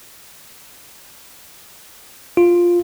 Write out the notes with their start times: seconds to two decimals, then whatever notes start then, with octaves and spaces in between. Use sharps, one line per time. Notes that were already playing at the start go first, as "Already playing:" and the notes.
2.37 F4